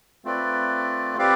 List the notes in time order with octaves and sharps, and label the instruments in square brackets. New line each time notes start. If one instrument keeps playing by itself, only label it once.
[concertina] A3 C4 F4 B4 D5
C4 G4 B4 D5 F5